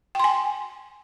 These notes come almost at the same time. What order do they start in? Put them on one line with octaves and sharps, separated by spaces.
G5 C6 G#5